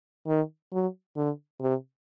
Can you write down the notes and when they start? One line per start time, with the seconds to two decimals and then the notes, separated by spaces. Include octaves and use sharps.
0.27 D#3
0.73 F#3
1.16 D3
1.61 C3